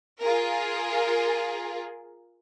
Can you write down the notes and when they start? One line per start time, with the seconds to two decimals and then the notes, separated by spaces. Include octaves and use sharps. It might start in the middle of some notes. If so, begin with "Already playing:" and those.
0.21 F4 G#4 A#4